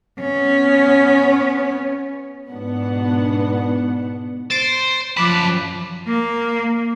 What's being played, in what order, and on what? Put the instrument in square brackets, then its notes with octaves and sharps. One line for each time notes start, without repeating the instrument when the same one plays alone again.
[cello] B3 C#4
[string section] G#2 B2 B3 D4 F#5
[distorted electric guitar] C5 [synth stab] A6 D7
[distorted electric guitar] F#2 A5 [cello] F3 [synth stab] B5 D6 F#6
[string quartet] A#3